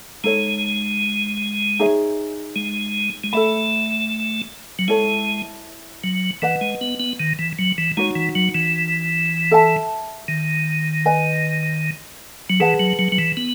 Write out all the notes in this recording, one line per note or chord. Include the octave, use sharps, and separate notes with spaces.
G#3 D#4 A4 C#5
D#4 G#4 C#5 E5
G#3
G#3
A3 A4 E5 B5
F#3
G#3 E4 A4 C#5
F#3
E3 B4 D#5 F#5
G#3
B3
B3
D#3
E3
F#3
E3
G#3 D#4 F#4 C#5
E3
F#3
E3
A4 E5 A5
D#3
B4 D#5 G#5
F#3
E3 G#4 B4 F#5 A5
F#3
F#3
F#3
E3
B3